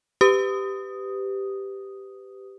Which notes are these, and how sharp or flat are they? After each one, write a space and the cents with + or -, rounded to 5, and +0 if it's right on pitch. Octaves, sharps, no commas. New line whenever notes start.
G4 +0 B4 +30 D#6 +0